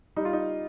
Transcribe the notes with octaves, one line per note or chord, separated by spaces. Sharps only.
G3 D#4
F4
D#4